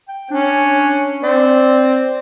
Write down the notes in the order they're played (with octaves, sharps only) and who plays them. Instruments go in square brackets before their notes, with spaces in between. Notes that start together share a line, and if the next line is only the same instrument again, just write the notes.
[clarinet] G5
[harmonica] C#4 [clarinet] D4
[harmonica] C4 [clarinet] D5